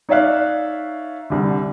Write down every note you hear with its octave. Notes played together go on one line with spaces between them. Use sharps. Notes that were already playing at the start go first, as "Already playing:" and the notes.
D#4 C#5 D5 E5 F5 F#6
C2 D3